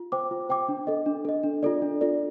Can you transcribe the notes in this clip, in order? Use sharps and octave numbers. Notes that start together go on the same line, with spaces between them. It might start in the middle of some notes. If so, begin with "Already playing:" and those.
Already playing: F4
C5 G5 D6
F4
C5 G5 D6
D4
A4 D#5
D4
A4 D#5
D4
F4 A4 D5
D4
F4 A4 D5